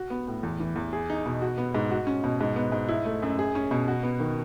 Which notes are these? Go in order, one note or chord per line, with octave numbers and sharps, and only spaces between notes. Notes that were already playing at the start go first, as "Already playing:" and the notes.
Already playing: F#4
B3
A2
E2
E3
E2
G#4
D#4
B2
F#4
B3
G#2
F#4
C#4
B2
G#2
B3
G#2
E4
A3
F#2
G#4
C#4
B2
F#4
B3
D#3